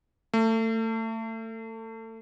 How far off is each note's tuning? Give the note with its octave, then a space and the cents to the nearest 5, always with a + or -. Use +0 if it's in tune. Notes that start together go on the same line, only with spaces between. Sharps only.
A3 +30